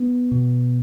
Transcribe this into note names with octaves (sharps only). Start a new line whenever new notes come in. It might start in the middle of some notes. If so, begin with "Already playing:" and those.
Already playing: B3
B2